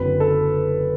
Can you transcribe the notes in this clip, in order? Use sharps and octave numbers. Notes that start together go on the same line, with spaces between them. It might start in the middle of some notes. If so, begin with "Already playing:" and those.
Already playing: F#1 F#2 D3 F#3 C4 B4
A4